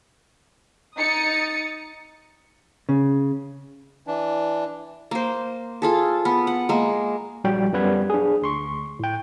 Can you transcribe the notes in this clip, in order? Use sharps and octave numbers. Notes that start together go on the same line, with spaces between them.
D#4 D#6 A6 C#7
C#3
E3 D4
A#3 C5
F4 G#4 A4
B3
F#5
G#3 A#3
A#1 F#3 G3 F#4 G5
F#2 G3 B3 B4 F#5 G#6
D4 G#4
D2 C6 C#6
A2 G5